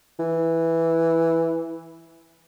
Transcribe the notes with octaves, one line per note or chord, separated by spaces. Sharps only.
E3